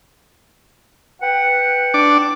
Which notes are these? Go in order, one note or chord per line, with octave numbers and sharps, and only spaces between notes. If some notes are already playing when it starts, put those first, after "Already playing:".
B4 F#5 G5
D4 D6